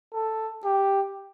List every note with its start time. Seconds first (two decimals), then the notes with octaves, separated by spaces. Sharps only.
0.13 A4
0.65 G4